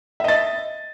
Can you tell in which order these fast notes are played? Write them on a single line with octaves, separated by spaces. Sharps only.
E5 D#5 A6